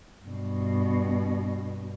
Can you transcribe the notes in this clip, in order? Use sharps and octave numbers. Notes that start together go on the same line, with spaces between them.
G2 B2